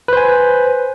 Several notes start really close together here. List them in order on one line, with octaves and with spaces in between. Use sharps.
B4 C5 G#5